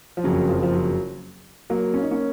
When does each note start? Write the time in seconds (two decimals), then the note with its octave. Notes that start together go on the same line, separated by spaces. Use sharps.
0.17 F3
0.24 F#1 F2 C#3 F#3
0.49 F3
0.63 F3
0.73 F#3
1.70 F#3 A#3
1.94 C#4
2.03 D#4
2.11 A#3 C#4